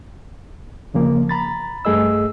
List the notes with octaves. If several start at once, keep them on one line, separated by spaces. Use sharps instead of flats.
D#2 C#3 F3 A#3
A#5 B5 A6
G2 A3 G#4 D#5 E6